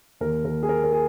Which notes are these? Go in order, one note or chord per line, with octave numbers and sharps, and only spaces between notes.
D#2 A#4
D#2 A#4
G#4
A#3 A#4
A#4
G#4